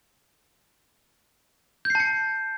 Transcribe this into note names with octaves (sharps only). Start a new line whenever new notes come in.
A5 G6 C7 C#7